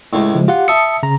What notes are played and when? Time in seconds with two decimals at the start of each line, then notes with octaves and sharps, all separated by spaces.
0.13 C#2 A2
0.35 C#3 F3 G#3
0.48 F4 G4 F#5
0.68 E5 A5 D#6 C#7
1.03 C#3 A#5